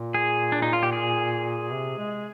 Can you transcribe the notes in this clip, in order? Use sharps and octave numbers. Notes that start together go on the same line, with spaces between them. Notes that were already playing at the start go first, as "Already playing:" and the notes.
Already playing: A#2
G#4
D4
D#4
F4
G4
G#4
C3
G#3